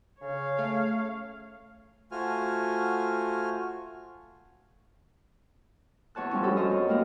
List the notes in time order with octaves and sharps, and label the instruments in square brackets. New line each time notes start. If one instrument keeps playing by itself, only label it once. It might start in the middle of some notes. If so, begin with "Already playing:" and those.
[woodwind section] C#3 [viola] C#5 F5
[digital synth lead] A3
[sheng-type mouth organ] A3 F4 F#4 C5 G#5 F6
[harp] E2 C#5 A5 F#6
F3 G3 C#4
F#2 C#4 A4
A#4 C5 D#5
B3
G3 A#3 E4 A#4